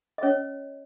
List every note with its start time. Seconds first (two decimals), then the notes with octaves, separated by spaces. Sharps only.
0.18 D#5
0.23 C#4 C#5